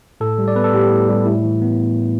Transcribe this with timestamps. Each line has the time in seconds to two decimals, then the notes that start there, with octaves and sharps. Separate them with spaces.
0.20 A2 A4
0.38 G3
0.48 D5
0.56 B3 B4
0.64 A4
0.73 A2 G4
0.91 A2
1.09 G3
1.26 A2 E4
1.44 E3
1.62 B3